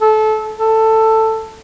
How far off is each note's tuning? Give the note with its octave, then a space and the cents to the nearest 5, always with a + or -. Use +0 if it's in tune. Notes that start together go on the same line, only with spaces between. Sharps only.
A4 -25
A4 +10